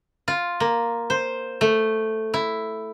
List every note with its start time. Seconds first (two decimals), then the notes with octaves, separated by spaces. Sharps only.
0.28 F4
0.60 A#3
1.10 C5
1.61 A3
2.34 E4